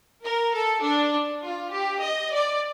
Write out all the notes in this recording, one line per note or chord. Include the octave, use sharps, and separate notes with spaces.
A#4
A4
D4
F4
G4
D#5
D5